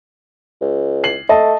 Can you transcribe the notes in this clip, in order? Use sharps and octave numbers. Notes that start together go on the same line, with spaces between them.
C#2
C7 F#7
A3 D#5 A5